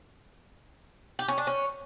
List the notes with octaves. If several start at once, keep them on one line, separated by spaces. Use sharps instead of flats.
G4
C#4
D4
C#4